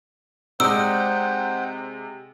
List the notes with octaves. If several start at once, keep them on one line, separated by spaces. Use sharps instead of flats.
C3 G#3 D#4 C5 D5 F#5 G5 E6